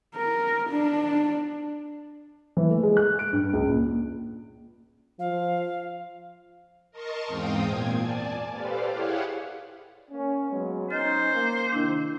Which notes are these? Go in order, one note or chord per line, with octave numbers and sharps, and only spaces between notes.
A#4
D4
E3
A3
G#3
F#6
D7
G2
C#2
A#2
F3 F5
A#4 D#5 A5 C6 C#6
E2 G#2 C4 F5 G5 D#6
A#2 G#6
D5 G#5 A5
G4 A4 B4 C5 D5 F5
E4 G4 G#4 C#5 F5 F#5
A#3 C#4
F#3 G#3 B3
C#4 D#4 C5 F6 A6
A#3
C3 D#3 D4 E4 G6